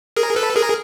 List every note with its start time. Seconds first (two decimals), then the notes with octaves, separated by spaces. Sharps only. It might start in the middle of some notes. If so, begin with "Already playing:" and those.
0.16 G#4 A#4
0.36 A4 B4
0.56 G#4 A#4